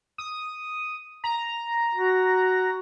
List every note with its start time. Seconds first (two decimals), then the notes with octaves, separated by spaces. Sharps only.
0.18 D#6
1.24 A#5
1.94 F#4